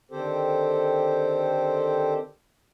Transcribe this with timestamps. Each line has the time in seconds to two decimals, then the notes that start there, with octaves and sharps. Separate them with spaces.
0.11 D3 D#3 C4 G4 A4 C5